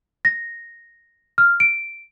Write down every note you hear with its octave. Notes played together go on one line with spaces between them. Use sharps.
A#6
F6
D7